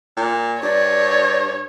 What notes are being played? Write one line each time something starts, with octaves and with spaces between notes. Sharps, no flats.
A#2
G2 C#5 D5